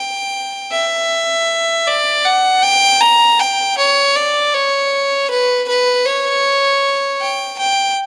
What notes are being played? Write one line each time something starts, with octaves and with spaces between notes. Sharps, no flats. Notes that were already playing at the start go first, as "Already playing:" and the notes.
Already playing: G5
E5
D5
F#5
G5
A#5
G5
C#5
D5
C#5
B4
B4
C#5
G5
G5